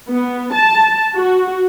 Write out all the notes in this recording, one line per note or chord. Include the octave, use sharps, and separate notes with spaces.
B3
A5
F#4